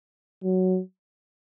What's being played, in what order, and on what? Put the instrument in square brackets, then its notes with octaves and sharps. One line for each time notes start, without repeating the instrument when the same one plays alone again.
[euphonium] F#3